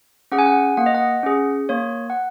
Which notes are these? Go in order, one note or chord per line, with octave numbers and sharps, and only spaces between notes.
C#4 G#4 F#5
G#5
F#5
A#3 F#5
D#5
F#5
C#4 G#4
A#3 C#5
F#5